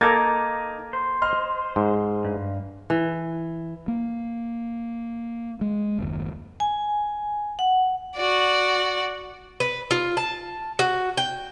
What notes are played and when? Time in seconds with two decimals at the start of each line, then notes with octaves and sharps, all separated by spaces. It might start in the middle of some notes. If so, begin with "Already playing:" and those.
0.01 A#3 D#4 A4 A#4 D6 G#6 A6
0.93 C5
1.22 D#5 C6 F6
1.76 G#2
2.25 G2
2.90 E3
3.88 A#3
5.61 G#3
5.98 F#1 D#2
6.60 G#5
7.59 F#5
8.16 F#4 D5
9.60 B4
9.91 F4
10.17 A5
10.79 F#4
11.17 G5